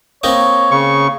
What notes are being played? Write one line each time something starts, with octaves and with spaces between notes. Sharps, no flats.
A#3 C4 D#4 C#5
C#3 C#6